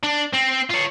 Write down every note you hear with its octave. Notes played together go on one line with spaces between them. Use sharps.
D4
C4
F4 C#5